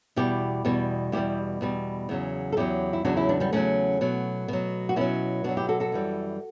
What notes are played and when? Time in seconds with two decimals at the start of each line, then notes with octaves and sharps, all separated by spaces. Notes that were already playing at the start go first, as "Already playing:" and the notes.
0.16 E2 B2 G3 E4 G4
0.65 E2 B2 G3
1.12 E2 B2 G3 E4 G4
1.61 E2 B2 G3
2.09 E2 C#3 F#3
2.52 A4
2.57 E2 C#3 F#3 E4 G4
2.93 E4
3.05 E2 C#3 F#3 D4 F#4
3.17 C#4 E4
3.29 B3 D4
3.40 G3 B3
3.53 E2 C#3 F#3 A3 C#4
4.01 B2 F#3
4.48 B2 F#3
4.89 F#4
4.96 B2 F#3 C#4 E4
5.44 B2 F#3 D4 F#4
5.57 E4 G4
5.69 F#4 A4
5.80 F#4 A4
5.92 F#2 E3 G3